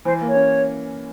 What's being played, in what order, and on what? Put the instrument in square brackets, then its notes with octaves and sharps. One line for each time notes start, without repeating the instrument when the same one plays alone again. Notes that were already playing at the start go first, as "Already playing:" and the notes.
[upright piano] E3 [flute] C5
[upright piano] A#3
[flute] C#5
[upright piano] C#4